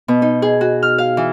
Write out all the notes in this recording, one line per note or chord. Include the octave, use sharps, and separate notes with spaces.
B2
D#4
G#4
F#4
F6
F5
E3